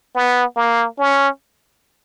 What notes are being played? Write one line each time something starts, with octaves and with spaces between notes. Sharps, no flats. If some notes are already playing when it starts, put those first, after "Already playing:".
B3
A#3
C#4